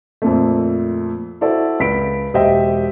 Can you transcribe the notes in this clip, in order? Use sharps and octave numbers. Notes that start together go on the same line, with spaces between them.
F2 A#2 A3
E4 F#4 A4 C5 D5
C#2 B6 D7
E1 G4 C5 D#5 E5 G5